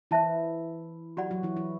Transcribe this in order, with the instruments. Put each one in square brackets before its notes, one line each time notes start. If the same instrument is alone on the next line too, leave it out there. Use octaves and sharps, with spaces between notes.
[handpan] E3 E4 [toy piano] C5 E5 A5
[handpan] F#3 F#4 [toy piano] G4 D5 F#5 B5
[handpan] F#3 F#4
E3 E4
E3 E4